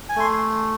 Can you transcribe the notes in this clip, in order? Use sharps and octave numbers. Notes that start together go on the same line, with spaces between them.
G#5
A3 C6